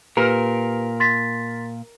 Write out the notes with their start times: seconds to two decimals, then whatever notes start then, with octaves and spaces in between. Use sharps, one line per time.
0.17 A#2 G4 A#4 B4
1.00 C6 A6 B6